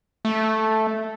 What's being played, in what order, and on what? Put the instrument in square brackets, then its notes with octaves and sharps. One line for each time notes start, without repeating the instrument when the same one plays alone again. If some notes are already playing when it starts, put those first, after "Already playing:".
[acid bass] A3